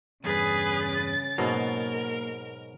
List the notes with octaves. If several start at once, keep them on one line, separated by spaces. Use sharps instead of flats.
E2 G2 C#3 G#4 B4 A6
G#2 B2 F#3 A#3 A#4